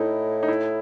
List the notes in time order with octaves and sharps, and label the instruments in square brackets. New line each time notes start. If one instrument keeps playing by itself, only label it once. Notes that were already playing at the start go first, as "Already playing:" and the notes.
Already playing: [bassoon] A2 [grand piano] D#4 E4
[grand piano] D#4
E4